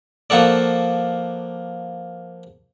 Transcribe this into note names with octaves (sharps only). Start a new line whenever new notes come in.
F3 A#3 F#4 A4 D5